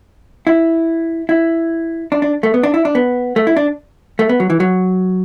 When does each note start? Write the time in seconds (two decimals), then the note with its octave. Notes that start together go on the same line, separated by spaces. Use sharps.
0.47 E4
1.29 E4
2.12 D4
2.22 D4
2.43 A3
2.54 B3
2.63 D4
2.74 E4
2.85 D4
2.95 B3
3.36 A3
3.47 E4
3.57 D4
4.19 A3
4.29 B3
4.40 F#3
4.50 E3
4.60 F#3